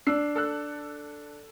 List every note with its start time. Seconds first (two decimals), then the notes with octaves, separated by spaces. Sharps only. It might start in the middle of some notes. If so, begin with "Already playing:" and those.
0.07 D4 E6 C7
0.35 A4 E6 F#6